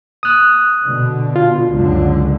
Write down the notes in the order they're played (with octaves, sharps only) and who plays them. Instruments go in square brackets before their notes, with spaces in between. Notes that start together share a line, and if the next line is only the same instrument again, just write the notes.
[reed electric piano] D#6 F#6
[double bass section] B2 D3
[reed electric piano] F4
[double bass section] C#2 F#2 D3